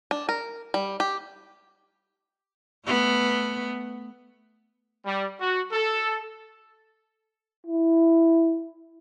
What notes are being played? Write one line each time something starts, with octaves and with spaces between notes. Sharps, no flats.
D4
A#4
G3
G4
A3 B3
G3
F#4
A4
E4